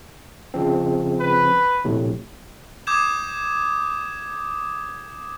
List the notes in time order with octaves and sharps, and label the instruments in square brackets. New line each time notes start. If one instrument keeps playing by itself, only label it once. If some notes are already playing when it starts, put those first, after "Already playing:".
[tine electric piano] C#3 F3 C4
[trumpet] B4
[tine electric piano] A#1 A2 C3
[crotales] D6 D#6 G6 G#6 E7